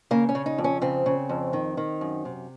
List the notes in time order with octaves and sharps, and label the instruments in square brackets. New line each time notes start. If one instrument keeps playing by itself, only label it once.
[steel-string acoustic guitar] C#3 A#3
C#4
C#3
D#4
F2
C#4
C#3 C4
C#3
F2
D#3
D#3
F#2
C3